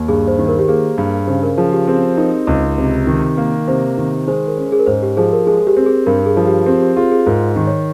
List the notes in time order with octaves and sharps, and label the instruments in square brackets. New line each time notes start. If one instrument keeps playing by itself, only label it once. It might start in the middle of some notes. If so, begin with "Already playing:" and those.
Already playing: [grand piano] D#2
[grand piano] G2 [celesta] G#4
[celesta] C5
[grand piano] D#3
[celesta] A#4
G4
[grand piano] A#3 [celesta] G#4
[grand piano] G2
[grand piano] C#3 [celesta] C5
[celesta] A#4
[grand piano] F3 [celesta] G#4
[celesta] G4
[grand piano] C4 [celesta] G#4
[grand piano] D#4 [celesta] A#4
[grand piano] C#2
C3
D#3
A#3
[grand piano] C3 [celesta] C5
[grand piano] D#3
[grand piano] G#3 [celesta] C5
[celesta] A#4
[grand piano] C#4
[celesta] G#4
A#4
[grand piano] G#2 [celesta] C5
[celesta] G4
[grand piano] F3 [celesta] G#4
[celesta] A#4
[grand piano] G#3 [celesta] G#4
[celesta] G4
[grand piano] C4
[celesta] G#4
[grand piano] G2 [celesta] A#4
[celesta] G#4
[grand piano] F3
[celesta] G4
[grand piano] C4 [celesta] G4
[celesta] G4
[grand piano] F4 [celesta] G#4
[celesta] G#4
[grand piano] G#2 [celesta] A#4
[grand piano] D#3
[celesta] C#5